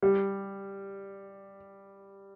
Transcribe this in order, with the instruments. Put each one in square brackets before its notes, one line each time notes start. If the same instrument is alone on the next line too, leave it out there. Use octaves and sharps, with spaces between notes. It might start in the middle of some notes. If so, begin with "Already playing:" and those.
[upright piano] G3